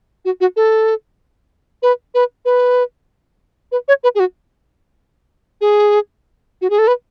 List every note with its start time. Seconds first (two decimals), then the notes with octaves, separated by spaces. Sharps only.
0.25 F#4
0.41 F#4
0.56 A4
1.83 B4
2.14 B4
2.45 B4
3.72 B4
3.88 C#5
4.04 B4
4.15 G#4
4.20 F#4
5.61 G#4
6.62 F#4
6.70 G#4
6.79 A4
6.88 B4